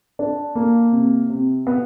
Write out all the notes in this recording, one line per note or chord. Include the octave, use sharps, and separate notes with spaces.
D4
A#3
C3
C3
B3